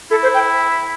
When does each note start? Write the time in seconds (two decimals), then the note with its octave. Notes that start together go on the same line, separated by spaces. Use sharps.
0.11 E4 A4
0.23 C5
0.34 G5